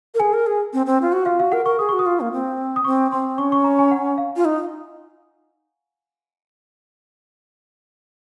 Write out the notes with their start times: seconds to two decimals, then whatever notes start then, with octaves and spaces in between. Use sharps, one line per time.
0.14 A#4
0.20 G#4 G#5
0.33 A#4
0.46 G#4
0.73 C4
0.86 C4
1.02 F4
1.12 F#4
1.26 F4 F5
1.40 F#4 F5
1.52 A#4 F#5
1.65 A#4 C#6
1.79 G#4 D#6
1.89 F#4 C#6
1.99 D#6
2.06 F4
2.20 A#3
2.33 C4
2.76 D#6
2.85 C4 C#6
3.11 C4 C6
3.38 C#4 C#6
3.52 C#6
3.64 A#5
3.79 G#5
3.91 F#5
4.18 F5
4.36 F4
4.45 D#4